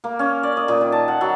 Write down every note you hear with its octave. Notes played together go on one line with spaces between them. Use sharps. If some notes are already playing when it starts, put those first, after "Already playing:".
A#3
C#4
D5
D#5
A#2
D#3
A5
F#5
F#3